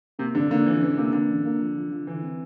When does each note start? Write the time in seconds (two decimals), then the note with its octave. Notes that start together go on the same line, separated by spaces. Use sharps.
0.19 C3 A#3
0.35 G2 D3
0.51 D3 A#3
0.66 E3 F3
0.81 A1 E3
0.97 C3 A#3
1.13 D3 A#3
1.29 A1
1.45 A#3
1.60 F3
1.76 F3
1.91 F3
2.07 D3 E3
2.23 C4